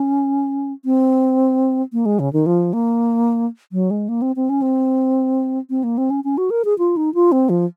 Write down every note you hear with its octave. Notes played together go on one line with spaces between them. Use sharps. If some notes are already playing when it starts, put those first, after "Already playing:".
Already playing: C#4
C4
A#3
G#3
C#3
D#3
F3
A#3
F#3
G#3
A#3
C4
C4
C#4
C4
C4
A#3
C4
C#4
C#4
F#4
A#4
G#4
F4
D#4
F4
C4
F3